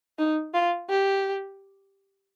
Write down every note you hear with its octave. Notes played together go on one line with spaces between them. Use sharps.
D#4
F4
G4